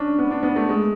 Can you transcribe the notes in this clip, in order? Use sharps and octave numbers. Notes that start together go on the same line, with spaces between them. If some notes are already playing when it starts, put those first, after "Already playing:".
Already playing: C#4 D4
B3
D4
B3
A3
G#3